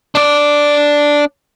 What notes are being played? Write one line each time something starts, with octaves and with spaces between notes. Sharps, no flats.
D4 D5